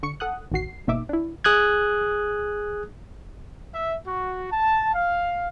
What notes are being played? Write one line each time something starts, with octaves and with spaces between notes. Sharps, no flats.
D3 C#6 C#7
A4 F#5 D#6 F#6
A1 D#2 F#4 C7
G1 B2 A#3 D#4 E5 D6
D4 E4
G#4 D#6 F#6 G#6
E5
F#4
A5
F5